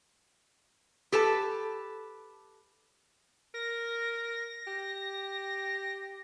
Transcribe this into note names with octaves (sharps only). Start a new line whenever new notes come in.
G4 A4 B4 A5
A#4 A#6
G4